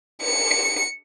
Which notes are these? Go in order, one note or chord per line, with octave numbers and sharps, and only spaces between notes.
C#7